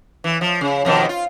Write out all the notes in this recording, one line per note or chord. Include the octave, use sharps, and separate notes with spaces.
E3
F3
C#3
F2 B2 D#3
F4